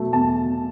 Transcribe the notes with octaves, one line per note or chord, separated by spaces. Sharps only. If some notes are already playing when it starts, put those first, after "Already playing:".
Already playing: B2 F#3 A3
E2 A5